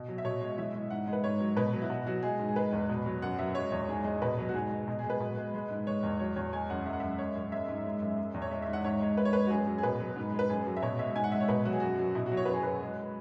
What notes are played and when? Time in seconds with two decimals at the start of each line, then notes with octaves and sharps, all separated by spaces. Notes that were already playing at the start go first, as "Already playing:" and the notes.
Already playing: B2
0.08 F#3
0.18 E5
0.25 B2 C#5
0.41 G#3
0.58 E3 E5
0.74 G#3
0.90 G#2 F#5
1.07 G#3
1.13 B4
1.24 G#2 C#5
1.40 F#3
1.56 B2 B4
1.73 F#3
1.82 E4
1.90 B2 F#4
2.07 F#3 F#4
2.23 G#3 G#4
2.39 G#2
2.49 G#4
2.56 G#3 B4
2.73 E2
2.89 B2
3.06 F#3
3.22 F#2 F#5
3.39 F#3 E5
3.55 G#3 C#5
3.72 E2 C#5
3.88 G#2 G#4
4.04 G#3
4.22 B2 B4
4.38 F#3
4.49 F#4
4.54 G#2 G#4
4.71 G#3
4.88 B2
4.99 G#4
5.04 G#3
5.10 B4
5.20 B2
5.37 G#3
5.54 G#3
5.71 G#2
5.87 G#3 C#5
6.03 E2
6.19 F#3 C#5
6.36 E2 C#5
6.53 G#3 G#5
6.70 F#2 F#5
6.86 G#3 E5
6.93 F#5
7.00 F#2 E5
7.18 G#3 C#5
7.35 F#2
7.52 G#3 E5
7.68 G#2
7.86 G#3
8.02 F#2
8.18 G#3
8.34 E2
8.42 C#5
8.51 G#3 E5
8.62 E5
8.68 G#2
8.73 F#5
8.84 G#2 C#5
9.01 G#3
9.17 G#2 B4
9.25 C#5
9.33 G#3 B4
9.47 F#4
9.50 F#2 G#4
9.67 F#3
9.78 G#4
9.83 B2 B4
10.00 F#3
10.16 G#2
10.33 G#3
10.39 B4
10.49 F#2 G#4
10.66 F#3
10.77 E5
10.82 B2 C#5
10.99 G#3 E5
11.16 G#2 G#5
11.24 F#5
11.32 G#3 E5
11.41 C#5
11.48 B2 B4
11.65 F#3 F#4
11.73 G#4
11.80 F#2 F#4
11.99 F#3
12.15 B2 E4
12.26 F#4
12.32 F#3
12.37 C#5
12.45 F#2 B4
12.53 G#4
12.63 F#3 B4
12.81 G#3